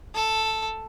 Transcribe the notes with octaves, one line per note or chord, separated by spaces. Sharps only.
A4